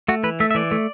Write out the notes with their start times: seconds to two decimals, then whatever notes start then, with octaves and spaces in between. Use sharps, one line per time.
0.08 A3 F#4
0.24 E3 B4
0.40 A3 E5
0.51 E5
0.55 E3 D5
0.71 A3